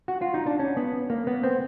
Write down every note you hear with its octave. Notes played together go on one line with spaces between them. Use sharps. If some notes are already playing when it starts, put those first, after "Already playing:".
F#4
F4
D#4
D4
C#4
B3
A#3
B3
C4